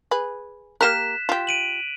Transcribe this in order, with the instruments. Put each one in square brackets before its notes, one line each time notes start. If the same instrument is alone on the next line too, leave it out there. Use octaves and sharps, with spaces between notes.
[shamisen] G#4 B4
[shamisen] A#3 G4 A#4 [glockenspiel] F#6 B6 E7
[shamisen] F4 G4
[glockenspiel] D7 D#7 F#7